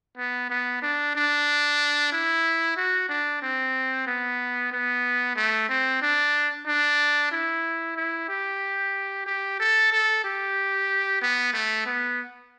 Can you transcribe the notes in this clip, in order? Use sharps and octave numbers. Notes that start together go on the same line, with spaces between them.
B3
B3
D4
D4
E4
F#4
D4
C4
B3
B3
A3
C4
D4
D4
E4
E4
G4
G4
A4
A4
G4
B3
A3
B3